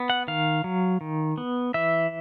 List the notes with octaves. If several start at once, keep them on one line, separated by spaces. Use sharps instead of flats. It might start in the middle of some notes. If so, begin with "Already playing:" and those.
Already playing: B3
F#5
D#3 F5
F#3
D#3
B3
E3 E5